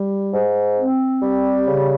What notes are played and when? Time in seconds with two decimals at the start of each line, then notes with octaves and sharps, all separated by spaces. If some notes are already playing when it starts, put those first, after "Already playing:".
Already playing: G3
0.33 G#2
0.78 C4
1.22 G3
1.68 C#3